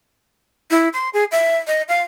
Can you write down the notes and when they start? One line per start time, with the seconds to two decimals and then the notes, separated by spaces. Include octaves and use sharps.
0.71 E4
0.93 C6
1.14 G#4
1.32 E5
1.67 D#5
1.89 F5